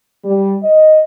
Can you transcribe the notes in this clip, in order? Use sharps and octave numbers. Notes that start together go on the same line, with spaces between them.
G3
D#5